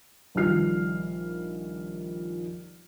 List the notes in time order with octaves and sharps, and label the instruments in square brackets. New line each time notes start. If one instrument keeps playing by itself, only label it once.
[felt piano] A#1 D#3 G3 F4 F6 C7